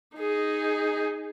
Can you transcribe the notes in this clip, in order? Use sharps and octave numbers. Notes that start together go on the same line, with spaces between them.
D#4 G#4